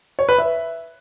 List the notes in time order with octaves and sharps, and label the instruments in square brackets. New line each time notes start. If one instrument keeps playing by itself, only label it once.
[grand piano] C#5
B4
E5